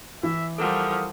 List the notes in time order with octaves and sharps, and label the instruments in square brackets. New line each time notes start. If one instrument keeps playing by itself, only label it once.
[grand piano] E3 [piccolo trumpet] E5
[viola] F3 G3 [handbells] A4 A#4 F#5 [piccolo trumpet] D#6